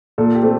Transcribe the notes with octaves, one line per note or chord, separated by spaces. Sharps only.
A#2 A4
G4
A3 C4